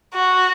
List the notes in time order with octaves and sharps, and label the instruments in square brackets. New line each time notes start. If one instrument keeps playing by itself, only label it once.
[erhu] F#4